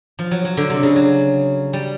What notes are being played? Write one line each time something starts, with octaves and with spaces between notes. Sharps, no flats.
F3
F#3
F#3
D3
C3
C#3
F#3
G3